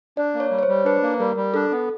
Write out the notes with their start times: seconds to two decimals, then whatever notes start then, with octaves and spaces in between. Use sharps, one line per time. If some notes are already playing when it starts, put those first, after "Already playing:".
0.17 D4 D5
0.34 A#3
0.40 C#5
0.51 G3
0.59 C#5
0.63 C5
0.68 G3
0.85 D4 B4
1.03 A#3
1.19 G3 A#4
1.37 G3
1.54 D4 A4
1.71 B3